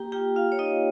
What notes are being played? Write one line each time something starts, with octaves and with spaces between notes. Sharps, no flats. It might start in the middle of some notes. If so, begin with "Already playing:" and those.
Already playing: A#3 G4 G5
F4 G4 G5
F4 F5
C#5
D#4 F4 D#5